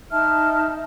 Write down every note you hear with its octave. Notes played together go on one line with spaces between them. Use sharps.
D#4 E5 A5 F6